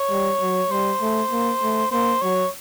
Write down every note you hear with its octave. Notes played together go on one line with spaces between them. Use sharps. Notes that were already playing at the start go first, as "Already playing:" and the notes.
Already playing: C#5
G3
F#3
G3 C5
A3
A#3
A3
A#3 C5
F#3 C#5